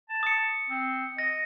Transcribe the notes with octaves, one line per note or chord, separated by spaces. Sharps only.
A5
D#6 C#7
C4
D#5 A#6